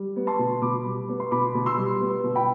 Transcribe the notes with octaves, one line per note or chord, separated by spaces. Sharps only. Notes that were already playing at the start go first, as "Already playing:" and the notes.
Already playing: G3
B3
A5 C6
B2
B2 B5 D6
G3
B3
C6
B2 B5 D6
B2
C6 E6
G3
B3
B2
G5 B5